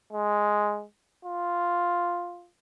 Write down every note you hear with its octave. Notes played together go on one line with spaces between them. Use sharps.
G#3
F4